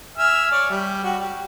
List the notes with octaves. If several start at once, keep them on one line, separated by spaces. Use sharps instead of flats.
E5 G#5 F6
C#5 D5
G3
F#4 G4
G4